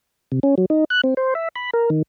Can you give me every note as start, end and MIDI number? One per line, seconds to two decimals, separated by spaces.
0.32 0.39 48
0.43 0.55 61
0.58 0.65 54
0.70 0.84 63
0.90 1.01 90
1.04 1.14 60
1.17 1.34 72
1.35 1.48 76
1.56 1.70 83
1.73 1.90 70
1.90 2.02 51